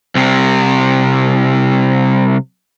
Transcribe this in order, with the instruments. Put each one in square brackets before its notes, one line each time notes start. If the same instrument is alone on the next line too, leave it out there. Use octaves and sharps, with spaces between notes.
[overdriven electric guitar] C2 C3